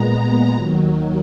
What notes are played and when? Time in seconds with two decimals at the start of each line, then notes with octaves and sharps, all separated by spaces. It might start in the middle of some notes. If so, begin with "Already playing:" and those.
Already playing: A#2 G#3 B3 A#5
0.54 D#2 D#3 F#3